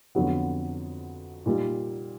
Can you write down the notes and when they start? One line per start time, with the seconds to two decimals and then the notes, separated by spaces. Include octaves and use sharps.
0.15 F2 D3 F#3 B3
1.46 A#2 G3 A#3 D#4